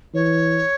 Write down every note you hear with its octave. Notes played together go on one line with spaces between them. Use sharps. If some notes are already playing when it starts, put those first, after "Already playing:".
E3 C#5